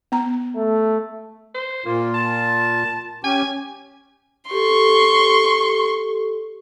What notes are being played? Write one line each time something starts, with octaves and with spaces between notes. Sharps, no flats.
B3 A#5
A3
C5
A#2 A#3 F4
A5
C#4 G4 G#5
G4 A4 C6 C#6